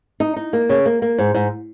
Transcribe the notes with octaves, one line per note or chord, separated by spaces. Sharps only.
D#4
D#4
A#3
C#3
A#3
A#3
G#2
G#2